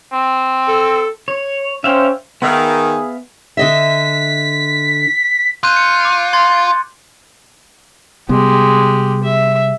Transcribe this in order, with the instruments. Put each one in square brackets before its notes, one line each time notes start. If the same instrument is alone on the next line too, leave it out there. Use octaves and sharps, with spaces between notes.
[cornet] C4
[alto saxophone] A4
[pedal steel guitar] C#5
[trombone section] C#4 C5 [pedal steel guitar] E5 F5 G5
[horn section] D#3 [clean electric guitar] B3 E5 F5 [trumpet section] G#4
[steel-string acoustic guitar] D3 D#5 E5 [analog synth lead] B6
[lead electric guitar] F4 [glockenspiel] F#6 G6 D#7
[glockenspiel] C#7
D6
C6 G#6 A6
[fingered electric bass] C3 G3 B3 [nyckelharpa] G#3 G4
[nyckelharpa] E5